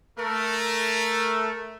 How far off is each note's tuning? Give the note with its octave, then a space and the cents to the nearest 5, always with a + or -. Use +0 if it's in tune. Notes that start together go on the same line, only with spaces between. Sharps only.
A3 +0 A#4 +0